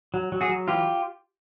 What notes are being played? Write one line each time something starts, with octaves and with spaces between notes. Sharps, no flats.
F#3
F#3
F#4 G#4
F#3
E3 F4 G4